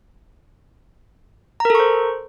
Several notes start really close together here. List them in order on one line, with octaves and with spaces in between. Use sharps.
A#5 A#4 A4 C#6 C5